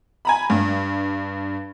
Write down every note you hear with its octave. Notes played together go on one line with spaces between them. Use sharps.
G#5 A#5 B5
G2